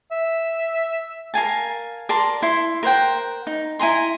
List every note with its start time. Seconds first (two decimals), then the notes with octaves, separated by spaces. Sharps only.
0.11 E5
1.34 A#4 F5 G#5 A5
2.09 A#4 D5 A5 C6
2.42 E4 C6
2.83 A#4 C5 F#5 G5
3.47 D#4
3.79 E4 G#5 A#5 C6